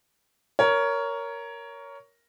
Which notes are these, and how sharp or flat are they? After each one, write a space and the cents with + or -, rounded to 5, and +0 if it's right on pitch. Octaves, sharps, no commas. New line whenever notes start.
A#4 +0 C#5 +15